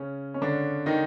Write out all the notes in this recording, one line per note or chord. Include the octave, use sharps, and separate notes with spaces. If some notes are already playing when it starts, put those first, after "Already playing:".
Already playing: C#3 C#4
C#4
D3 D4
D#3 D#4